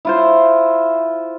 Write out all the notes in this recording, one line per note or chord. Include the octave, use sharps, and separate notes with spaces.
E4 F4 C5